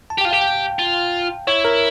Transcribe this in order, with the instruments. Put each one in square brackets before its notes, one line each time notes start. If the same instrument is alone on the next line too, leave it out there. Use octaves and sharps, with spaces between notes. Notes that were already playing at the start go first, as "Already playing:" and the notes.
[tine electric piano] A5
[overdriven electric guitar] G4
[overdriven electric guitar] F4 [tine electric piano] G5
[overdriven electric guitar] G4 [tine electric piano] F5
[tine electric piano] G5
[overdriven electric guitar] F4
[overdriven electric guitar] E4 [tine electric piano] C#5
[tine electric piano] A#4